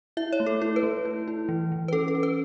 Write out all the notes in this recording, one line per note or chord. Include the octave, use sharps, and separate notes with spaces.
E4 E5
C#5
A3
A4
E4 A4
B4
A3
E4
E4
E3
E3
B4
C#4 A4
A4
C#4
B4